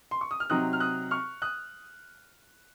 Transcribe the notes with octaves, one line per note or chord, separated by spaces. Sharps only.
C6
C#6
D#6
F6
C3 F#3 C4 D#4 D#6 F#6
F6
D#6 F#6
C#6 F6
D#6 F#6